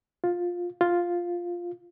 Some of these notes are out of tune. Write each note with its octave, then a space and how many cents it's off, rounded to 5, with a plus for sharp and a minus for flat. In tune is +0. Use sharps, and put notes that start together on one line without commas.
F4 +10
F4 +0